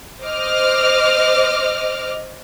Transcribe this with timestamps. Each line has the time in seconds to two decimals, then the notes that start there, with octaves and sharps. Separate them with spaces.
0.23 C5 D#5 D6 F6